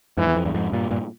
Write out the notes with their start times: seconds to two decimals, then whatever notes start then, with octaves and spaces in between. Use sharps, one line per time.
0.17 F2 G#2 E3
0.27 E2
0.36 F2
0.45 E2 G2
0.54 F2 G#2
0.72 G2 A#2
0.91 G2 A#2